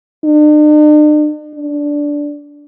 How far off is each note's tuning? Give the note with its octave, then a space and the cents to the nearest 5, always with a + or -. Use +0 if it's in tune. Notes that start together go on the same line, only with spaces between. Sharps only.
D4 +45
D4 -10